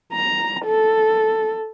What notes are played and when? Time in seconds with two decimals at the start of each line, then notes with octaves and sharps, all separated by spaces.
0.13 A#5
0.66 A4